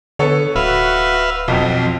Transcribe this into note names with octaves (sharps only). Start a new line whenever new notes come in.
D3 B3 A4 C#5
D1 F#4 B4 E5 F5
B1 F2 F3 C4